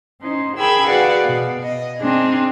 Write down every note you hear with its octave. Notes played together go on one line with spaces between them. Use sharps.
C#4 D#4 C5
G#4 A#4 G5 G#5 B5 E6
F#4 G#4 B4 D5 F5 F#5
B2
D#5
C4 D4 D#4 G#4